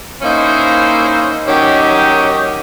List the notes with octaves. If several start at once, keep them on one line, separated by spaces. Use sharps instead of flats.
A#3 C#4 D#4 E4 C5
D#3 F#3 C#4 G4 D#5